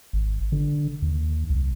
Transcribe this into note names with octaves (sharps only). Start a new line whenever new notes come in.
G#1
D3
D#2
C2